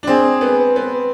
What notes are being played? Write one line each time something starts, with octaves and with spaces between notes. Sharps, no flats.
D4
C4 G#4
B3
B3